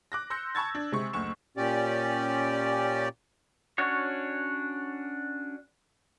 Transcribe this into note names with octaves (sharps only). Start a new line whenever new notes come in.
D6 F#6 A#6
C6 E6 G6 A#6 C#7
A5 B5 C#6 E6 G#6 A6
D4
C3 G#3 C#6
F#1 D2 C#6 E7
A#2 C#4 G4 D5
C#4 D4 F#4 C#5